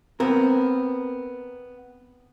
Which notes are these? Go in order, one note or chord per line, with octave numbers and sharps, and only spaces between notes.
B3 C4 A#4